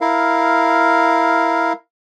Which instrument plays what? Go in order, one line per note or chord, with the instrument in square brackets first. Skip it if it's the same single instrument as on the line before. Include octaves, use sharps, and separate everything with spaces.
[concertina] E4 A#4 F5